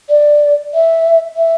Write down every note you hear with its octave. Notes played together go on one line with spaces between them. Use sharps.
D5
E5
E5